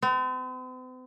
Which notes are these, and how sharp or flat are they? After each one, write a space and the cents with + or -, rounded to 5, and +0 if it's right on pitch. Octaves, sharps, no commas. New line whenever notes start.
C4 -45